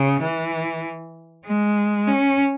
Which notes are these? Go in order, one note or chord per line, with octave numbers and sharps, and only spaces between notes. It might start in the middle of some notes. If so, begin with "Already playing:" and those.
Already playing: C#3
E3
G#3
C#4